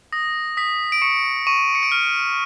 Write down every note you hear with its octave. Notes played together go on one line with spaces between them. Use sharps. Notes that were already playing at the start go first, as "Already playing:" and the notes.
D#6 A#6
D#6 B6
D7
C#6 C#7
C#6 D#7
C#7
D7
F6 D#7